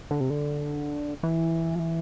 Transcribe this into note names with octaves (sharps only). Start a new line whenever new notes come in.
D3
C3
D3
E3
F3
E3